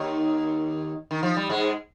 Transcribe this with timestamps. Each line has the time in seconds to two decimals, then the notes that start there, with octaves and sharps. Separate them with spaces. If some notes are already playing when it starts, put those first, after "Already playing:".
Already playing: D#2 D#3
1.11 D#3
1.23 F3
1.37 G3
1.49 G#2 G#3